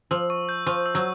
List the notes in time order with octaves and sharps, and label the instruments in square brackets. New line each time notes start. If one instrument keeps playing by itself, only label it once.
[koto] F3 [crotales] E6
[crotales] C#6
G6
[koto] F3 [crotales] C#6
[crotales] E6
[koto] F#3